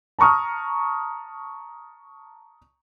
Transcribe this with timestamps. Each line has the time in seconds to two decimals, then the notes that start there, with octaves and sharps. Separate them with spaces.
0.19 A5 A#5 C#6 D#6 F6